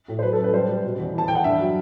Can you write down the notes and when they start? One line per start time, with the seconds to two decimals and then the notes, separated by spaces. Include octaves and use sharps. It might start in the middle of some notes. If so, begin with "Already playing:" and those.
0.08 A2
0.19 C5
0.22 F#3 B4
0.33 A4
0.39 F#2
0.44 B4
0.53 G3 C5
0.69 G3
0.84 B2
0.99 E2
1.14 E3 A5
1.28 E3 G5
1.35 F#5
1.44 G2 E5
1.60 F#3